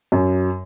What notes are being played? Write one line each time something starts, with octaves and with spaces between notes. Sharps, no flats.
F#2